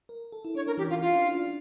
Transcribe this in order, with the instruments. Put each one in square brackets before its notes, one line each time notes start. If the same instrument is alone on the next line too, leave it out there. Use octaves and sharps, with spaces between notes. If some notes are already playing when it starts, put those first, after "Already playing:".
[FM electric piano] A#4
A4
E4
[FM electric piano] D4 [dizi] C#5
[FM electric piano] C#4 [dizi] A#4
[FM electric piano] E3 [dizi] G4
[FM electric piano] E3 [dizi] F4
[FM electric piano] C#4 [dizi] F4
[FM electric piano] D4
E4
D4